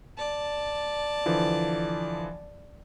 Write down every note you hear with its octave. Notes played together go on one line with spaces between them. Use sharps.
D5 A5
D3 E3 F3